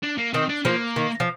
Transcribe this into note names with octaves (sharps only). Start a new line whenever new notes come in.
D4
A#3
D#3 C4
D4
F3 A#3
D#3
F3